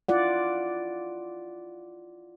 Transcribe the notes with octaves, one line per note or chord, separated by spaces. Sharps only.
E4 F4 D5 F#5